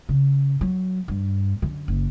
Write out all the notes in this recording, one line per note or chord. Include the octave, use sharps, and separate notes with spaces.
C#3
F#3
G2
F#2 D3
F#1